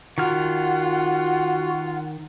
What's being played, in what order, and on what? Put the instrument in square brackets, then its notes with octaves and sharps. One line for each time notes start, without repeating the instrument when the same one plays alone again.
[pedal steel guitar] D#3 F6 [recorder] F4 [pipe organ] F#4 [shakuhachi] F#5